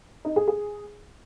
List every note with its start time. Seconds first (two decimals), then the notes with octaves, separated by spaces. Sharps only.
0.25 D#4
0.36 G#4
0.48 G#4